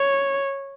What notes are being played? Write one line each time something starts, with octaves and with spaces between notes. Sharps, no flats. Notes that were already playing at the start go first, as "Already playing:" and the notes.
Already playing: C#5